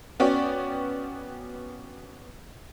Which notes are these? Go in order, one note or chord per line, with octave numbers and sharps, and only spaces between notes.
B3 C#4 F#4 C#5 D5 G5